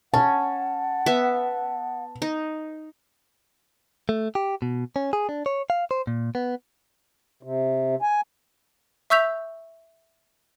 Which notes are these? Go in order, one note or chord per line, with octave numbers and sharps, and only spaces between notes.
C#4 F#5 A5
B3 E5
D#4
A3
G4
B2
C#4
G#4
D4
C#5
F5
C5
A#2
B3
C3
G#5
E5 C#6 E6 G6 B6 F7